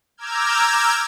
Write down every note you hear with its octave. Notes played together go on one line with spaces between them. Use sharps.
A#5 D6 E6 F6 G6 G#6